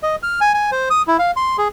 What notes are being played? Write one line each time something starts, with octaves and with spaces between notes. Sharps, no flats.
D#5
F6
G#5
G#5
C5
D#6
E4
F5
C6
G#4